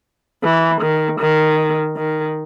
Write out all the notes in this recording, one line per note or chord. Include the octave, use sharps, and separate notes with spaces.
E3
D#3
D#3
D#3